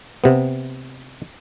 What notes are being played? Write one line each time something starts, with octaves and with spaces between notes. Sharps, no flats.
C3 B3